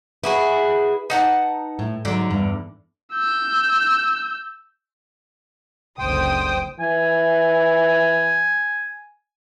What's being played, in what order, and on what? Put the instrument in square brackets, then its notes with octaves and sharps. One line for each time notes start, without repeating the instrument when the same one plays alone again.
[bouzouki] E4 F#4 G#4 [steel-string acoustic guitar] B4
[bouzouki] D#4 F#5 A5
[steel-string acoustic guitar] A2
[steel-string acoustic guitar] G#2 F#3 [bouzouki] D3
[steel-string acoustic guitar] E2 G2
[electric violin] E6 G6
[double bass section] F#1 C#2 D3 [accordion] C5 G5 [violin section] D#6
[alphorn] E3 [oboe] G#5